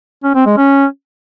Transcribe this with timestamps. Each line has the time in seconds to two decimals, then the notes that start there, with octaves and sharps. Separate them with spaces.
0.24 C#4
0.35 C4
0.46 G#3
0.57 C#4